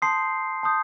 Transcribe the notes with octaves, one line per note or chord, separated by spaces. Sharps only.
A5 C6 D#6 G6 C7
A5 C6 D#6 G6